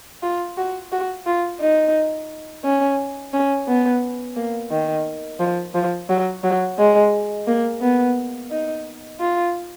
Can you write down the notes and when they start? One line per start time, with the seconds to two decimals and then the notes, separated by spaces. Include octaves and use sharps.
0.23 F4
0.57 F#4
0.92 F#4
1.26 F4
1.61 D#4
2.64 C#4
3.33 C#4
3.68 B3
4.37 A#3
4.71 D#3
5.40 F3
5.75 F3
6.09 F#3
6.44 F#3
6.78 G#3
7.47 A#3
7.82 B3
8.51 D#4
9.20 F4